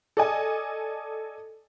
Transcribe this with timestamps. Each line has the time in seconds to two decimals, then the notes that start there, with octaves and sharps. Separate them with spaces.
0.17 A4 D5 D#5 G#5